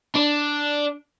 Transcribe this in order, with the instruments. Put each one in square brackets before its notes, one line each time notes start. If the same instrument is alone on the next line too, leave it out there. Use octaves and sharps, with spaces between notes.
[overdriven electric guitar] D4